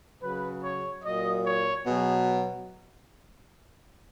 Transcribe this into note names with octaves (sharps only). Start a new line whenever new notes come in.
C#3 F#3 B4
C#5
A#2 F#3 D#5
C#5
B2 F#3 G#4